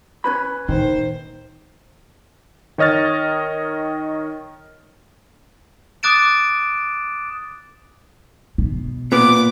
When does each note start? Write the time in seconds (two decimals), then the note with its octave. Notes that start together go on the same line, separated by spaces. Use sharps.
0.24 C#4 B4 B5
0.68 A#2 D#3 C5
2.78 D#3 C#5 D#5 F6 A6
6.03 D6 D#6 F#6 A6 D7 E7
8.58 B2
9.12 A#2 B3 D6